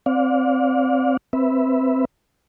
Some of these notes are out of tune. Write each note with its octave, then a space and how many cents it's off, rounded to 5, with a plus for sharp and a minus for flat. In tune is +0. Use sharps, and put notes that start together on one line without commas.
C4 +0 D5 -20 F5 +35
C4 +0 B4 +0 E5 +0